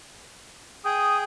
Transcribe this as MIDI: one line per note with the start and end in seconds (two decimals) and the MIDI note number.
0.85 1.24 68
0.85 1.24 79
0.85 1.17 87